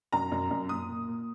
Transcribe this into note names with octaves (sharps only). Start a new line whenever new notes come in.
F#2 A#5
F#2
F#2
A#2 D#6
A#2
A#2